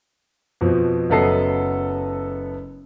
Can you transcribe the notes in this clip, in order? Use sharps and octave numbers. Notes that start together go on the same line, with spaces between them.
F2 B2 F3
F#1 F#3 B3 A4 D#5 C7